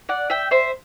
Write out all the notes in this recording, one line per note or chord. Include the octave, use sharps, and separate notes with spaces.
D5 F#5
E5 G5
C5 E5